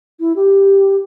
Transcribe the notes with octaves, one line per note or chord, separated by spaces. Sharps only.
E4
G4